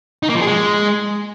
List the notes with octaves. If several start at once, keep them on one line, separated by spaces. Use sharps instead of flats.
D#4
A#3
F3
G#4
G#3